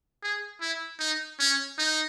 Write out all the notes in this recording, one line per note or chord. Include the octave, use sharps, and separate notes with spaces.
G#4
E4
D#4
C#4
D#4